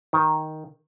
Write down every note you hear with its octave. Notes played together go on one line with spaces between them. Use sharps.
D#3